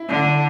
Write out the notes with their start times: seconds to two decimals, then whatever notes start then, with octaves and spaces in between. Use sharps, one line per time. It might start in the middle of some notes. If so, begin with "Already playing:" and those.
Already playing: E4
0.09 D3